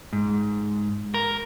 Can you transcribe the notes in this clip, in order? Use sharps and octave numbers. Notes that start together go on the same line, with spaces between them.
G#2
A#4